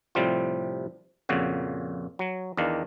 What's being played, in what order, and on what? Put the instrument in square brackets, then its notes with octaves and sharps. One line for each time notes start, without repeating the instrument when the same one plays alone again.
[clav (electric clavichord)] A2 C3 F3 G3 C4 F4
F2 A#2 C#3 F#4
F#3
E2 D#3 D4 F5